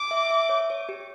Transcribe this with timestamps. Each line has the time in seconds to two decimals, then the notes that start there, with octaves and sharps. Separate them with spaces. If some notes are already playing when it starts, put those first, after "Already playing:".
Already playing: D6
0.11 E5
0.30 E5
0.49 C#5
0.70 C#5
0.89 G4